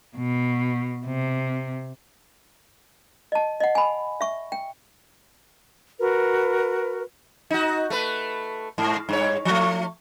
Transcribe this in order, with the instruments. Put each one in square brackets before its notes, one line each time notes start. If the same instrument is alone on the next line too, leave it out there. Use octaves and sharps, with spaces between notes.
[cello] B2
C3
[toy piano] D#5 A5
D#5 F#5
G#5 B5
E5 C#6
G5
[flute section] F#4 A#4 B4
[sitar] D#4 F#4
A3 B4
G#2
G2 C#5
F3 A3